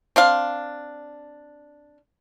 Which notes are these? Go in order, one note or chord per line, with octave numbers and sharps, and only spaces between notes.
C4 D4 F5